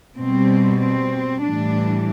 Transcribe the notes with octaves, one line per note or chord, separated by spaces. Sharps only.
B2 G3 C4
C4
A2 E3 G3 D4